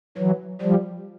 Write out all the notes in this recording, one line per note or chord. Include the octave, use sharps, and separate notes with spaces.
E3 F#3
F3 G3